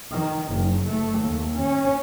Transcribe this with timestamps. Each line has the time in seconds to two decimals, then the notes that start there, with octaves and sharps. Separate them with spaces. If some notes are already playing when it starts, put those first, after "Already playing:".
0.12 D#3
0.53 F#1
0.89 A3
1.21 D#2
1.61 C#4